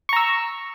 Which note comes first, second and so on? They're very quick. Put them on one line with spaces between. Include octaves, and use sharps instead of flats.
C#6 A#5 E6